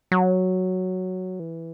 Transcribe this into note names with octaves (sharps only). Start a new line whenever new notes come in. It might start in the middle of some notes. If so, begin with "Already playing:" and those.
F#3
E3